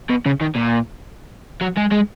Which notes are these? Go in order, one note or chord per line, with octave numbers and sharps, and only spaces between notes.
B2
C#3
D#3
A#2
F#3
G#3
G#3